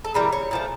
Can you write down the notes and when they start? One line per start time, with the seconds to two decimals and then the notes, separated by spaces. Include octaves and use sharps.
0.04 A4
0.14 C#3 E3 G3 A#4
0.32 C#5
0.51 A#2 F3 A3